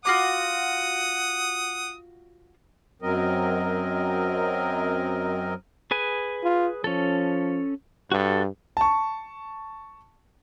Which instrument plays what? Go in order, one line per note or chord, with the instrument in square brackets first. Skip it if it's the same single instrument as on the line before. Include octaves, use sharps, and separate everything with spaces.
[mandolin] F4 F#4 D6 [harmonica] F#5 D#6
[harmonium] F#2 F#3 C4 A#4 D#5
[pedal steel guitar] G#4 B4 G#5
[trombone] F4
[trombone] F3 [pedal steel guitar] C#4 A4
[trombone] G2 [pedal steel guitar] F#4 A4
[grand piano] A5 C#6